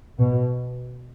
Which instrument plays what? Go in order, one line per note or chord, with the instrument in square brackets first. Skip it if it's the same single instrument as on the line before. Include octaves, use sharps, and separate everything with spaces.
[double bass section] B2